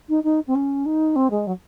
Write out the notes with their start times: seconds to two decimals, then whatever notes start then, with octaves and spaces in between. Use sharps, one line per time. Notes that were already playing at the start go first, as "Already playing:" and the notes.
0.09 D#4
0.23 D#4
0.47 C4
0.55 C#4
0.85 D#4
1.16 C4
1.30 G#3
1.46 F#3